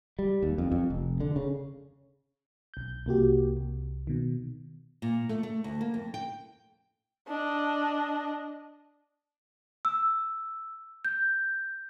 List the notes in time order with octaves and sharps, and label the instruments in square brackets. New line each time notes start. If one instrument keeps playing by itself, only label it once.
[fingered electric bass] G3
D#2
F2
F2
F1
D3
C#3
[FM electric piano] B1 G6
C2 A#3 F#4 G4
C2
B2 D#3
[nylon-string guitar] A#2
A3
A3
D2
A#3
F2
G5
[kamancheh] D4 D#5
[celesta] E6
G6